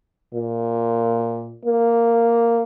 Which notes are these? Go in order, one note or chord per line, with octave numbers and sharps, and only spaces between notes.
A#2
A#3